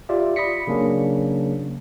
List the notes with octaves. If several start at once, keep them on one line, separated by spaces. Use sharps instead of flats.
F4 G4 D5 E5
B5 D#6 A#6 B6 C#7
C#3 F#3 A#3 C#4 D4